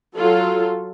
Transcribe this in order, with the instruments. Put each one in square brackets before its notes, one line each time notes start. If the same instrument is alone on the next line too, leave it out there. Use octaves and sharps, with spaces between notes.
[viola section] F#3 F4 A4